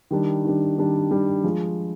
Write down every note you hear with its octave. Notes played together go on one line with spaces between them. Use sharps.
D#3 G3 D4
D#3 G3 D4
D#3 G3 D4
D#3 G3 D4
F3 G#3